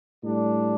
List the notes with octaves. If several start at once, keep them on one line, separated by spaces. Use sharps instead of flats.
A2 G3 D4